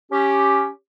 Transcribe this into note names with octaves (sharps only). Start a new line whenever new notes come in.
C#4 G4